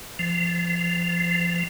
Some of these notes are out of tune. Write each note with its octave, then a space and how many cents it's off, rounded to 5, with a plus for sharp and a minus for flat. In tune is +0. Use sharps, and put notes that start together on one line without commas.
F3 -20